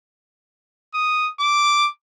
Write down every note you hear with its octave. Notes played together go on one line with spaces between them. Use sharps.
D#6
D6